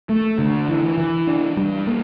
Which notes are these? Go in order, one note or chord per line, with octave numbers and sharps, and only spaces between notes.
A3
D3
E3
E3
D4
G3
A#3